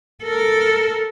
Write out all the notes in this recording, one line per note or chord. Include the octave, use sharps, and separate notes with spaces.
A4 A#4